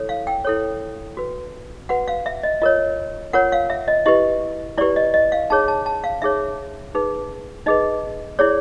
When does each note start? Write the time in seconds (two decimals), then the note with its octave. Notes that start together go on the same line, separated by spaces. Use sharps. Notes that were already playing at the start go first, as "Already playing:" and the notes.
Already playing: E4 A4 C#5
0.09 F5
0.27 G5
0.45 E4 A4 C#5
1.17 F#4 B4
1.89 F#4 B4 F#5
2.08 F5
2.26 E5
2.43 D#5
2.61 F4 A#4 C#5 D#5
3.33 F4 A#4 C#5 F#5
3.52 F5
3.70 E5
3.88 D#5
4.06 E4 G4 B4 D#5
4.77 E4 D5
4.81 G4 B4
4.96 D#5
5.14 D#5
5.32 F5
5.50 D#4 G#4 C#5 A5
5.68 A5
5.86 A5
6.04 F5
6.22 D#4 G#4 C#5 E5
6.95 D#4 G#4 B4
7.66 D#4 G#4 B4 D#5
8.39 E4 G#4 C#5 D5